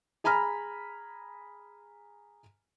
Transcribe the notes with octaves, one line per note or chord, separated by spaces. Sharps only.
G#4 G#5 A#5 B5 F6